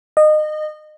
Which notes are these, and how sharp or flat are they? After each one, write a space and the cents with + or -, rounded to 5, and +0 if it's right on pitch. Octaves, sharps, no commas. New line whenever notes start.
D#5 -25